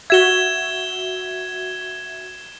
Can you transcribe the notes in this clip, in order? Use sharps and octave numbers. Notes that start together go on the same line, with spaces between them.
F#4 E5 G#6 E7 G7